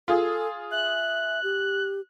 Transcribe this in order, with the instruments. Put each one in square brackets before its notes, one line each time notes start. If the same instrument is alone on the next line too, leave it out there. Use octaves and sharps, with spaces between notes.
[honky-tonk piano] F4 G#4 [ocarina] A4
[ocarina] E5 [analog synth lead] F#6
[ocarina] G4